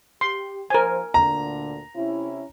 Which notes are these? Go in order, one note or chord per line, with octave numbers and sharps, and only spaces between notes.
G4 C6
F3 A#4 C5 G#5
D2 A#2 D3 A#5
C3 C#4 E4